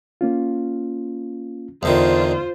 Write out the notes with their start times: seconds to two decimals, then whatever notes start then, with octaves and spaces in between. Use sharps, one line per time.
0.21 A#3 C#4 F4
1.83 E2 D3 D#3 F4 C5